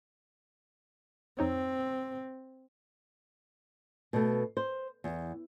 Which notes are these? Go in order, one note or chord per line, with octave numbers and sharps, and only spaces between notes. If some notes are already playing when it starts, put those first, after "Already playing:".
F2 C4 D#4 C#5
B2 A3
C5
E2